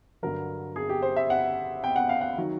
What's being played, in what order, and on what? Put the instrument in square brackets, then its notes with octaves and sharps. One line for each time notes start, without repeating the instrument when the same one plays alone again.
[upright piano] G2 D3 F#3 A#4
G#4
G4
C5
E5
F#5
G5
F#5
F5
F#5
D#3 F#3